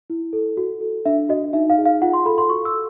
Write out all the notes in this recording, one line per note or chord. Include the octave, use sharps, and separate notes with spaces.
E4
A4
F#4
A4
D4 E5
F#4 D#5
D#4 E5
F5
G#4
F5
F4 F#5
C6
A4 B5
C6
F#4 C#6
E6
A4